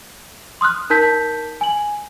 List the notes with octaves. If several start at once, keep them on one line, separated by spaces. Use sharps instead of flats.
C6 D#6 F6 F#6
D#4 A#4 A5 G6 B6
G#5 F#7